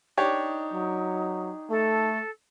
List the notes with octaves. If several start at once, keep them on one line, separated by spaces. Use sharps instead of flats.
D4 D#4 G4 C#5
F#3
A3 A4